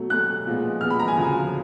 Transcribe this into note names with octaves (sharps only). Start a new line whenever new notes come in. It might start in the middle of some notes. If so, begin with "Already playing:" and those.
Already playing: B2 F#3 A3
B2 F#3 A3 F#6
A#2 F3 G#3 B3
A#2 F3 G#3 B3 F6
B5
A#5
G#5
D2 C#3 F3